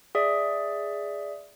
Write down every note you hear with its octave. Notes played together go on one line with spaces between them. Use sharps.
G#4 D5 E5